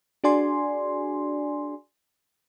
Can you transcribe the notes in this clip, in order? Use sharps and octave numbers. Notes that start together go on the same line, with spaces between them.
D4 F#4 G#4 D5 G#5 C6